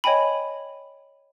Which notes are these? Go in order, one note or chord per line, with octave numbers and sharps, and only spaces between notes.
C#5 D#5 G5 G#5 B5